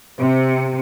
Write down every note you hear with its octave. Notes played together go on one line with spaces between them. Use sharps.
C3